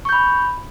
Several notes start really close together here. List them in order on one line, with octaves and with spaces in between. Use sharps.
C#6 G6 B5